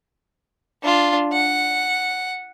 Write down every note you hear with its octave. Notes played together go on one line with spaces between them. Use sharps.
D4 F4
F#5